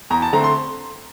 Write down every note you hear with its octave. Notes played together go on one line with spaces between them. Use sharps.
E2 A#5
A5
D3 A3 C4 A#5
C6